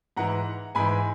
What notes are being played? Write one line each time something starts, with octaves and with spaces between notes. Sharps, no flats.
G#2 E3 F#5 A#5
G#2 E3 G#5 B5